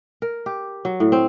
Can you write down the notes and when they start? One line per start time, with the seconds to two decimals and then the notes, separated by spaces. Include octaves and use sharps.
0.22 A#4
0.46 G4
0.85 F#3
1.00 A2
1.12 C4